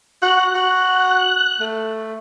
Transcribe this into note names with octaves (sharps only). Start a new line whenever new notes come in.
F#4 F#6
F#4
A3